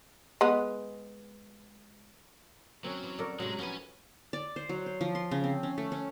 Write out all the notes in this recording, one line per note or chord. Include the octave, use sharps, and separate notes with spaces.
G#3 B3
F#3 C4 C#4
E3
F#3 A4 A#4 D5
A2 C3 F#3 G#3
F3 B3 C#4 B4 G#5
D5
C5
F#3
C5
F3
C6
C#3
C4
C#4
A3
C#4